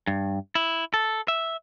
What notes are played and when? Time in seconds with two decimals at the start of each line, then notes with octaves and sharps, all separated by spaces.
0.07 G2
0.55 E4
0.94 A4
1.28 E5